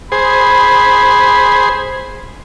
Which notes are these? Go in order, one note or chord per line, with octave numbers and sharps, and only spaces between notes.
G#4 C5 B5